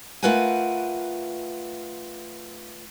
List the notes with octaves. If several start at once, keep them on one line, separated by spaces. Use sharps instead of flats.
A3 F4 A#4 B4 F#5 G#5